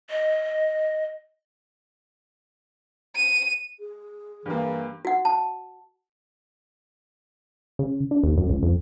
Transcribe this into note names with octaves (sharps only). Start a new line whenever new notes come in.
D#5
D#7
G#4
G2 E3 A#3
F#4 F#5
A5
C#3
D4
D#2
F#2
C#2
F2